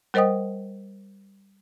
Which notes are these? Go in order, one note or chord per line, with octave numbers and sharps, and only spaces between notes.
G3 A#4 C5 D#5 G5 D#6